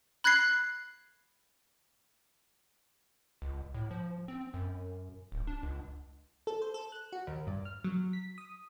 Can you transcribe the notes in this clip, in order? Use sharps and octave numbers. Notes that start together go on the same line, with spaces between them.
B5 F#6 G#6 A#6 C7
C#2
A2
F3
C4
F#2
D1
D4
C#2
A4
C5
A4
F#6
F#4
D#2
G2
F6
F#3
B6
D#6